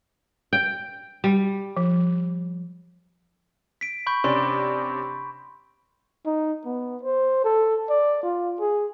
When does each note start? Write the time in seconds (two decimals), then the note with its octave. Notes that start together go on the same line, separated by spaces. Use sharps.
0.53 G5
1.24 G3
1.77 F3
3.81 B6 D7
4.07 B5 C#6 G6
4.24 C3 C#4 D4 C6
6.26 D#4
6.65 B3
7.03 C5
7.44 A4
7.89 D5
8.23 F4
8.60 G#4